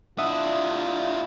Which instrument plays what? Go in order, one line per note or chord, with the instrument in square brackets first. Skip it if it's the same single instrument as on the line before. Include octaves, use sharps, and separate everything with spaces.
[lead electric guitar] D4 E4 [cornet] F4 [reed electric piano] E5 F#5 D#6